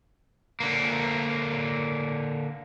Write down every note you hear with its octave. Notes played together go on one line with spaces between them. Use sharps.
D3 A#3